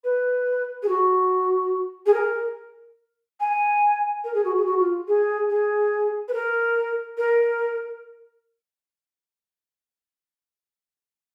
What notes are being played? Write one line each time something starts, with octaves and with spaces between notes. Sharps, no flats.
B4
G#4
F#4
G#4
A#4
G#5
A#4
G#4
F#4
G#4
F#4
F4
G#4
G#4
B4
A#4
A#4